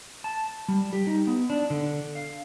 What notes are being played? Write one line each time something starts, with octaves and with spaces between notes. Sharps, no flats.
A5
G3
G4
D#4
B3
D4
D3
F5